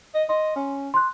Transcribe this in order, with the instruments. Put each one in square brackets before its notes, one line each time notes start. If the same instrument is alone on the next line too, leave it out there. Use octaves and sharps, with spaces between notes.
[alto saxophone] D#5
[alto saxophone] D#5 [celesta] C6
[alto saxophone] C#4
[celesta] C6 F#6